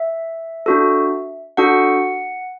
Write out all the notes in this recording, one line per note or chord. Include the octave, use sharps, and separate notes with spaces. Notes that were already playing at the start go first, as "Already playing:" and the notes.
Already playing: E5
D4 F#4 A4
D4 F#4 A4 F#5